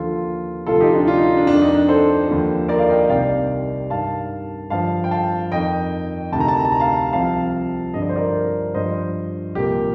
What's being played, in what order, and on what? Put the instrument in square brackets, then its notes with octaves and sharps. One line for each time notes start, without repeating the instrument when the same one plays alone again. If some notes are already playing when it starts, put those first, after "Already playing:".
Already playing: [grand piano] D#2 D3 F3 F4 A4
D2 C3 F3 F4 A4
D#4 G4
D4 F4
D4 F4
D#4
D4
F2 D#3 D4
D#4
D4
A4 C5
D#2 D3 F3
A#4 D5
D5 F5
D#5 G5
D#5 G5
C2 C3 D#3 D5 F5
G2 D#3 F5 A5
G2 D3 F3 F5 A5
G5
F5 A5
F2 D#3 D#5 G5
D2 C3 D#3 A5
A#5
A5
A#5
A5
A#5
F5 A5
C2 C3 F3 F5 A5
G2 D3 F3 D#5
D5
C5
A#4 D5
G2 F3 C5 D#5
C2 A#2 F3 G4 A#4